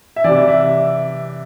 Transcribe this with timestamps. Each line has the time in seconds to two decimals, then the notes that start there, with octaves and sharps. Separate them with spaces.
0.16 E5
0.24 C3 E3 D5
0.48 E5